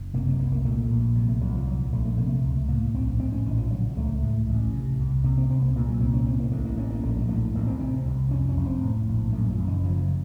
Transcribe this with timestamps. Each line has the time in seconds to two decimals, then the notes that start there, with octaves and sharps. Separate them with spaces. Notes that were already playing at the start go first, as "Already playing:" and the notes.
Already playing: F#1
0.14 C3 A#3
0.27 F#3
0.39 C2 A#3
0.52 A#3
0.65 A#2 A3
0.90 A#1
1.16 C3 F#3
1.29 A3
1.41 C2 F#3
1.55 F3
1.67 A#2 F#3
1.93 A#1 A3
2.06 A3
2.18 C3 A#3
2.29 A3
2.44 C#2
2.68 A2 A#3
2.94 A#1 C4
3.20 A2 C4
3.32 C#4
3.46 A#1 D#3
3.58 F3
3.71 C#3 F#3
3.96 C#2 A3
4.23 A2
4.48 A1
4.73 C3
5.00 C2
5.24 C3 A#3
5.37 C4
5.50 C2 C4
5.62 A#3
5.75 A#2 A3
5.88 F#3
6.01 C2 C4
6.14 C#4
6.27 A2 C4
6.40 A#3
6.52 A1 A3
6.65 A#3
6.77 A2 C#4
6.90 A#3
7.03 A#1 A3
7.17 F#3
7.29 A2 A3
7.55 A1 A#3
7.67 C4
7.79 C3 C4
8.06 C2
8.30 F2 C#4
8.49 C#4
8.57 F1
8.66 C4
8.82 A2
9.08 A#1
9.33 F#2 A3
9.51 F3
9.59 F#1
9.67 D#3
9.84 C#3 F3